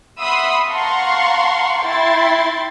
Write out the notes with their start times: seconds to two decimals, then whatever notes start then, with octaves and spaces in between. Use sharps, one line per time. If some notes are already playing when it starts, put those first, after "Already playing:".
0.19 E5 F#5 B5 C6 D#6 E6
0.68 F5 F#5 A5 A#5 C6 C#6
1.86 E4 G5 C6 A6